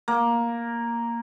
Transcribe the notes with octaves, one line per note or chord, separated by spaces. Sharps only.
A#3